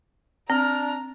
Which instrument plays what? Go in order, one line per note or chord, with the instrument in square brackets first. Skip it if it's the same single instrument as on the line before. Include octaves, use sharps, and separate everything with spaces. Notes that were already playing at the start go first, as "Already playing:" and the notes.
[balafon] C4 [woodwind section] D4 F6 [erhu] A#5